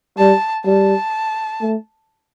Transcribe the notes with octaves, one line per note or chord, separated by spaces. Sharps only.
G3 A5
G3 A5
A3